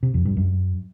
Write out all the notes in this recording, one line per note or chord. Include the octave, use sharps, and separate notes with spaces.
C3
F2
G2
F#2